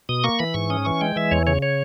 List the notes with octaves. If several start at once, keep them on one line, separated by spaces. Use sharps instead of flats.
B2 D#6
A#3 C#6
E3 B5
G#2 C#6
C#4 D#6
E3 C#6
G#3 G5
E3 E5
E2 C#5
C#3 C#5
C#5